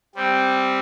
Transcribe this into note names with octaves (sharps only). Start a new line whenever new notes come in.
G3 C4 G4